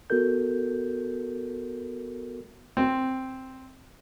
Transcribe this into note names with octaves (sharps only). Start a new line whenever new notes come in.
B3 F#4 A4 A#4 G6
C4